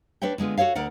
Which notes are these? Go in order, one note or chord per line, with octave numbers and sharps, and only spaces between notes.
D4 B4 C#5 E5 G5
D3 G#3 B3 F4
F#4 G4 A4 C#5 F5
D2 A#4 D5 F#5